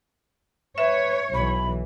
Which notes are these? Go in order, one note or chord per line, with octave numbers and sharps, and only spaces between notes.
B4 C#5 E5
B1 E3 B5